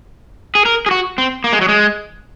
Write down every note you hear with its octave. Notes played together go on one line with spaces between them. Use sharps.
G#4
A#4
G#4
F#4
C4
A#3
G#3
F#3
G#3